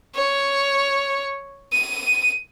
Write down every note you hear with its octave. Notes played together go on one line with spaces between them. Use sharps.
C#5
D#7